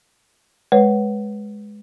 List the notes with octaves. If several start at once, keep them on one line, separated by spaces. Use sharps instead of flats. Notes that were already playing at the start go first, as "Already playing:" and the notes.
G#3 B4 C#5